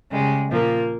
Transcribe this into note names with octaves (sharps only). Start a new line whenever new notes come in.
C#3 G3 G#3
A#2 F3 A#3